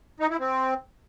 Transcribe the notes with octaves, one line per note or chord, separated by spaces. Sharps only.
D#4
E4
C4